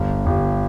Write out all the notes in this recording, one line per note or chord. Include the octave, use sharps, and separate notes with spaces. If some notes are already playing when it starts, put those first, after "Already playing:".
Already playing: G1
G1